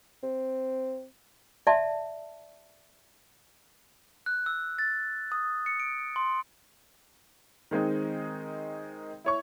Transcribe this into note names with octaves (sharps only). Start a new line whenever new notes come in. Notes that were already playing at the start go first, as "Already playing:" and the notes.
C4
D5 E5 A5
F#6
E6
A6
D#6
C#7
D7
C6
D#3 G#3 C4 D#4
E4 C#5 C#6